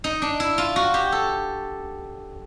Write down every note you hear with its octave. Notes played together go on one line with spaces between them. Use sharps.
D#4
D4
E4
F4
F#4
G4
A4